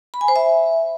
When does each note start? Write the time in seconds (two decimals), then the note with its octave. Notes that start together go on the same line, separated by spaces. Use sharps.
0.14 B5
0.21 G#5
0.28 C5
0.36 E5